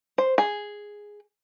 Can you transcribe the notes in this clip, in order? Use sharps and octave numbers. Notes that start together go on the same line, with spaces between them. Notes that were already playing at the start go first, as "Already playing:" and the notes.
C5
G#4